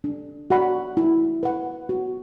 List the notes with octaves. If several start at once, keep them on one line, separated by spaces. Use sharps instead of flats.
D4
F#4 D5 F#5 B5
E4
B4 F#5
F#4